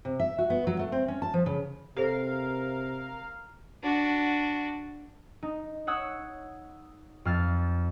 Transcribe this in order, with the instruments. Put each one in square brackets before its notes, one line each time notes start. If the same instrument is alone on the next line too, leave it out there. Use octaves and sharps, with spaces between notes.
[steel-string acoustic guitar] C3
E5
F#4
B3
F#3
A3
C4
C#4
A5
F3
C#3
[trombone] C3 [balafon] G4 A4 C5 [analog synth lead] A#4 [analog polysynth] F5
[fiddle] D4 F#4
[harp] D#4
C#5 F#5 D#6 E6
F2 F5 F6 A6